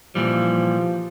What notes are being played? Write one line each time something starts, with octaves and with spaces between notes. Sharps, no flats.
A#2 E3 F3 G3